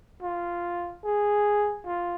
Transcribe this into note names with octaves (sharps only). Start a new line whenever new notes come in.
F4
G#4
F4